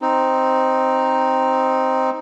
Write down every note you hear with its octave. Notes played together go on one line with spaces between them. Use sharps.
C4 D#4